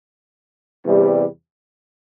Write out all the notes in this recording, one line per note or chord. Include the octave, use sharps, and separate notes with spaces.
E2 C3 G3